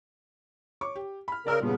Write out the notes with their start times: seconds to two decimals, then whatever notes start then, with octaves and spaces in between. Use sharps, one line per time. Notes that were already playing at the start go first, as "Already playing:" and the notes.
0.81 C#5 C#6 D6
0.96 G4
1.28 B5 F6
1.47 C#3 A#4 D5 E6 F6
1.62 G2 A#2 C#3 B3